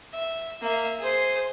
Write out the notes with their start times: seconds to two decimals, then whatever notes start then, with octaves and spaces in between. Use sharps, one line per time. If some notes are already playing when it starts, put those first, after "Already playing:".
0.13 E5
0.61 A#3 E5
0.99 G#4 C5